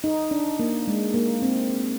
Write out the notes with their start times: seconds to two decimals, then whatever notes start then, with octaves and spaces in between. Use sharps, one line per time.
0.04 D#4
0.31 D4
0.59 A#3
0.88 G#3
1.14 A#3
1.42 C4